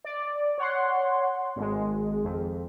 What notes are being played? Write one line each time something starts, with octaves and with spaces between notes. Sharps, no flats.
D5
C#5 F#5 C6
G#1 G#3
F2